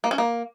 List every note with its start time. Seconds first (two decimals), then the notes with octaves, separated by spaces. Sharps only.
0.04 A#3
0.11 C#4
0.18 A#3